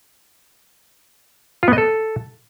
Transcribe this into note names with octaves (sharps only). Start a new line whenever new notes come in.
F4
B3
D#5
A4